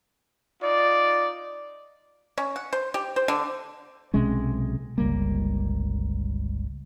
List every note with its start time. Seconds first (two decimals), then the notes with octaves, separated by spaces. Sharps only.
0.62 D#4 F4 D5
2.38 C#4
2.56 F#5
2.73 C5
2.94 G4
3.16 C5
3.28 D3
4.14 B1 C3 G#3 C#4
4.98 G1 C#2 G3 A#3